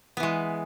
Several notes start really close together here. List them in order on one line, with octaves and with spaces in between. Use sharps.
B3 E3 G#3